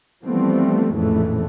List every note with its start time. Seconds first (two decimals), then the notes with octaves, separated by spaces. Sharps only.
0.25 E3 F3 G3 A3 B3 C4
0.93 A#1 F2 A2 C#3 E3 A3